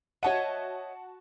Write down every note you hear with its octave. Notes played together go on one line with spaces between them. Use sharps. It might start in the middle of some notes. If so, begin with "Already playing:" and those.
F#4 C#5 D#5 E5 F#5 A5 D#7